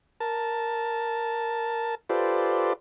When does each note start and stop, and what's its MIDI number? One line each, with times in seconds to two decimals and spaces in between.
0.20 1.95 70
0.20 1.95 81
2.09 2.73 65
2.09 2.73 67
2.09 2.73 69
2.09 2.73 71
2.09 2.73 72
2.09 2.73 74